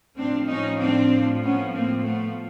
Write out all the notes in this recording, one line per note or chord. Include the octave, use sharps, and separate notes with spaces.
A2 F3 C4 D4
C#4 D#4
C4 D4
B3 C#4
A#3 C4
A3 B3